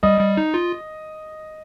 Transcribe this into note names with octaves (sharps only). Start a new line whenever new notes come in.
G3 D#5
G3
D#4
F4